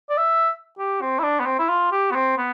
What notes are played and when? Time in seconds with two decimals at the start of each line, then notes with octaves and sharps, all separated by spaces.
0.10 D5
0.18 E5
0.79 G4
1.02 C4
1.19 E4
1.23 D4
1.40 B3
1.46 C4
1.59 E4
1.69 F4
1.92 G4
2.11 B3
2.16 C4
2.38 B3